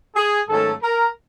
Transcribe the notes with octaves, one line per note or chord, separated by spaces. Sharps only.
G#4
G#2 D#3 F#3 A3 C#4 A4
A#4